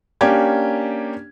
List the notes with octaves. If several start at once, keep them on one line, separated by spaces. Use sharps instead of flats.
A#3 C#4 D4 G4 G#6